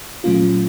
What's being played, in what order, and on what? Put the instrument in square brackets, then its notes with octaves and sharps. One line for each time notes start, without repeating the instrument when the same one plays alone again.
[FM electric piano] A#2 F#3 A3 C#4 F4